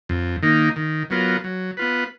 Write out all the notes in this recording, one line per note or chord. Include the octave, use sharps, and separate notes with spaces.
F2
D#3 A#3 D#4
D#3
F#3 B3 F4 A#4
F#3
B3 F4 B4